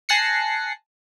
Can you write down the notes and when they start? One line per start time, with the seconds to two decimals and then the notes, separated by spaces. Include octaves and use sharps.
0.09 G#5 A5 F#6 A#6 C7 C#7